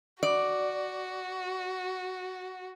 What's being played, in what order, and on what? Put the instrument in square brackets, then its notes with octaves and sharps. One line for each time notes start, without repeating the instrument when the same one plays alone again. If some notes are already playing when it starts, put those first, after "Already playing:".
[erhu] F#4 [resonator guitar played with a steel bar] D5